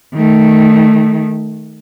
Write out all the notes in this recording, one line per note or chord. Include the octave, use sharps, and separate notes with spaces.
D#3 A3